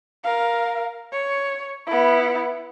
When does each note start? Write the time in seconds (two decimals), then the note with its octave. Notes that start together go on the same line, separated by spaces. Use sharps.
0.24 A#4 F5
1.13 C#5
1.87 B3 E4